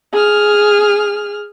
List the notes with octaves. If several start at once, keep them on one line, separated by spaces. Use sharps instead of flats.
G#4 F6